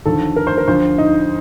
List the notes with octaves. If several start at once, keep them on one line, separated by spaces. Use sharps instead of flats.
D#2 D3 F3 A4
A#4
C5
A#4
D2 D3 F3 C5
D#4